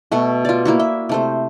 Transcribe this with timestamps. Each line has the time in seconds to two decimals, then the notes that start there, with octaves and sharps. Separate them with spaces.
0.12 B2 A3 F#4
0.45 F4 D5
0.65 A#3 E4 F#4
0.79 E5
1.09 C3 A3 C5